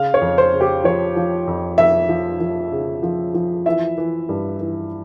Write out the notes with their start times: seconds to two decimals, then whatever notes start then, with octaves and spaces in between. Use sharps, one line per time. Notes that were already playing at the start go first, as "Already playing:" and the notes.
Already playing: C#3 F5
0.14 C#5
0.21 F2
0.38 C5
0.53 C#3
0.61 G4
0.84 F3 C#5
1.16 F3
1.47 F2
1.78 F2 E5
2.09 F3
2.40 F3
2.72 C#3
3.03 F3
3.34 F3
3.66 E3 E5
3.97 E3
4.29 G2
4.60 E3